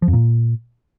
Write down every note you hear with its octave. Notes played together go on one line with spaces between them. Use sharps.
F3
F2
A#2